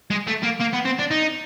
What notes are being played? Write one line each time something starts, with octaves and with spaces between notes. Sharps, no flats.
G#3
A3
A#3
A#3
B3
C4
D4
D#4